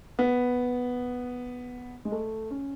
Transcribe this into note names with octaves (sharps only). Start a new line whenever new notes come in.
B3
G#3
A3
C#4